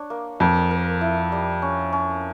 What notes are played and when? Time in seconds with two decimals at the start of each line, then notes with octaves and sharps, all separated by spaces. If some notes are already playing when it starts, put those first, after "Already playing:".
Already playing: D4 C#5
0.10 A#3
0.40 F2 A#4
0.71 A#4
1.01 E4
1.32 G3
1.62 C#4
1.93 C#4